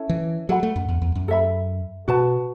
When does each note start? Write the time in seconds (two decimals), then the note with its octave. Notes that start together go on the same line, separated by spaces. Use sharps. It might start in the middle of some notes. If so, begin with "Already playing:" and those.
Already playing: C#4 E4 A4 C#5
0.09 E3
0.49 F#3 A4 F#5 B5
0.63 A3
0.76 F#2
0.88 E2
1.02 E2
1.15 F#2
1.28 A4 E5 B5
2.08 B2 F#4 B4 A5